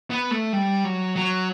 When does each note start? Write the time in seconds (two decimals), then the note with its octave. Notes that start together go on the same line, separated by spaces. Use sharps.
0.10 B3
0.31 A3
0.53 G3
0.84 F#3
1.16 F#3